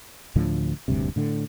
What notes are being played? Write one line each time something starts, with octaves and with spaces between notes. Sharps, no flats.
D2 A2 D3 F3
D#1 D2 G2 C3
A2 D3